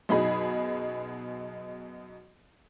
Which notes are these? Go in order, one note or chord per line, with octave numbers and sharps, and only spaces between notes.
F#2 B2 D#4 G#4 B5